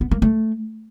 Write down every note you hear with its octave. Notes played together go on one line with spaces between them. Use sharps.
B3
A#3
A3